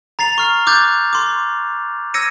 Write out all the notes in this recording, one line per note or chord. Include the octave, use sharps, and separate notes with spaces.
A#5 A6 C7 F7
C#6 F6 C7
D6 F#6 G6 A6
C6 D6
E6 G#6 A#6 C#7 D#7